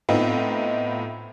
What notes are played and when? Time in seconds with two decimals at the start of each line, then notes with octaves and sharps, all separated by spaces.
0.09 A2 B3 C4 D#4 F4